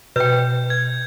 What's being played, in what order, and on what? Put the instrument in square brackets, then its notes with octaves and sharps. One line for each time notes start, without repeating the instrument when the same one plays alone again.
[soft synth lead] B2 [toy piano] B4 G5 [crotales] G6
[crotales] G#6